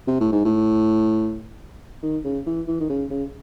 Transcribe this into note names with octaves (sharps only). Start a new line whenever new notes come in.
C3
A2
G#2
A2
D#3
C#3
E3
E3
D#3
C#3
C#3